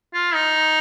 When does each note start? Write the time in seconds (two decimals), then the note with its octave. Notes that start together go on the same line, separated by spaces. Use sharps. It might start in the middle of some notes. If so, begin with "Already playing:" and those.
0.14 F4
0.34 D#4